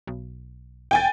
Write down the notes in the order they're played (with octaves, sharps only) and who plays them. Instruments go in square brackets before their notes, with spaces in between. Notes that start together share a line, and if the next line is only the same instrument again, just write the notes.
[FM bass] B1
[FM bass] E1 [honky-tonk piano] G5 G#5 A6